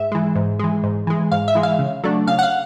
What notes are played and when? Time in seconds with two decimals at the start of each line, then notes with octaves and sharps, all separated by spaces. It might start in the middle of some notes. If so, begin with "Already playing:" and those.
Already playing: G#2 E5
0.12 E3 G#3
0.36 G#2
0.59 E3 G#3
0.84 G#2
1.07 E3 G#3
1.32 G#2 F5
1.48 E5
1.55 E3 G#3
1.63 F5
1.79 C#3
2.04 F#3 A3 D4
2.27 C#3 F5
2.39 F#5
2.43 F5